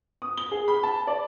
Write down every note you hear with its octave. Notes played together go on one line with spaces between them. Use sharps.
D#6
G7
G#4
B5
A5
D5